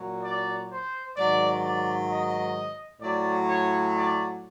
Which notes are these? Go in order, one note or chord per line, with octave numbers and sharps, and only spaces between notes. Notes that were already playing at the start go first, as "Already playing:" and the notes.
Already playing: A#2 F#3
D5
C5
G#2 D#3 F#3 D5
D5
D#5
A2 F#3 D5
C#5
D5